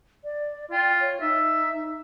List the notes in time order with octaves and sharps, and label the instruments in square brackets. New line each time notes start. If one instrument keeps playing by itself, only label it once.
[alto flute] D5
[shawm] F4 [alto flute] G5
[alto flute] C#5
[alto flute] D#4 [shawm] E5